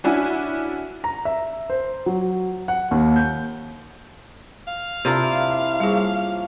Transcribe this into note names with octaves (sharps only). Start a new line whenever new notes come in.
C#4 D4 E4 F#4 E5 G#5
A#5
E5
C5
F#3
F#5
D#2
G6
F5
C3 D4 E4 F4 A#4
F3 G3 A#3 C#4 G#4